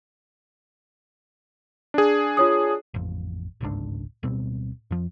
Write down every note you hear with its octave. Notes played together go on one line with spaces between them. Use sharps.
D4 G#4
F4 C#5 D#6
A1 F2
G1 C#2 G#2 D4
D1 B2 G3 C4
F2 F3